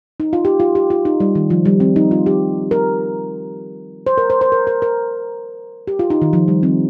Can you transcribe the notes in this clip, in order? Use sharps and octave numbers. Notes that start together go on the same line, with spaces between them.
D#4
F4
G4
F4
G4
F4
D#4
G3
D#3
F3
G3
C4
D#4
F4
G4
A#4
C5
A#4
C5
C5
A#4
A#4
A#4
G4
F4
D#4
D#3
F3
G3
C4